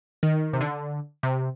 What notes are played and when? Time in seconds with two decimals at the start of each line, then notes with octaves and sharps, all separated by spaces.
0.23 D#3
0.53 C3
0.61 D3
1.23 C3